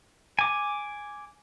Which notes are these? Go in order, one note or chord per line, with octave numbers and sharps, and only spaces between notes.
G#5 D6